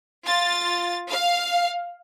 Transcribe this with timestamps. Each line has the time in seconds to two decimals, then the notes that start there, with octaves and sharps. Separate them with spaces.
0.24 F4 A6
1.09 F5